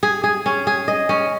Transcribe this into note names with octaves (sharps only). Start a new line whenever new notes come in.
G#4
G#4
C#4
G#4
D#5
C#4